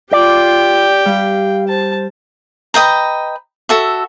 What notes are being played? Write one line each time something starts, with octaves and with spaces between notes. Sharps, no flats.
F4 G4 D5 G5
G3 F5
C5 A5
B4 D#5 G5 A#5
F#4 A4 E5